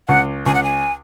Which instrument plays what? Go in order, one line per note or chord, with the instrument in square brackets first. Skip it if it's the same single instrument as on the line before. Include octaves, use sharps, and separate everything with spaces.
[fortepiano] C#2 [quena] F#5
[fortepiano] C#2 [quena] G#5
[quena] F#5
G#5